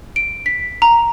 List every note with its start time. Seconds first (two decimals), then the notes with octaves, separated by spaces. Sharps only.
0.16 D7
0.46 B6
0.82 A#5